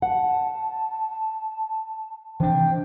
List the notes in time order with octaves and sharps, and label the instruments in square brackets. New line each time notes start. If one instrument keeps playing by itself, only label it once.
[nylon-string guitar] F#5 [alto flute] A5
[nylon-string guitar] C3 [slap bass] E3 D4 [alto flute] G5